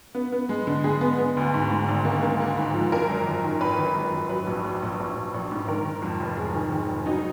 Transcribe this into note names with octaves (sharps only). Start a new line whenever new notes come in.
B3
B3
G#3
D3
G#3 G#4
B3
B3
D2
G#2
G#2
G#1
A#3
A#3
A#3
G#2
F3
F#2 A#4
G#1
G#1
D#3
G#1 B4
G#1
G#1
F#2
F#3 B4
A#1
A#1
A#1
A#1
A#1
A#1
G#2
D#3 A#4
D#3
F2
F1
F2 G#4
D#3
D#3
F1
F#3 D#4